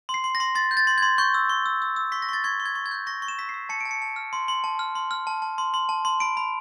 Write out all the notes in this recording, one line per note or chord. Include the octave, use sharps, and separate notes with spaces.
C6
C7
C6
A#6
C6
C6 A6
G6
A6
C6
C6 G#6
C#6 G6
E6
C#6
E6
E6
E6
C#6 B6
A#6
C#6 A6
C#6 G#6
C#6
G#6
C#6
G#6
G6
C#6 A#6
C#6
E7
E6 B6
C7
E6
A5 C#7
A5 D7
C#7
A5
F6
C6
C6
A5
F6
C6
F6
A5
A5
C6
C6
A5
C6
B5 D7
B5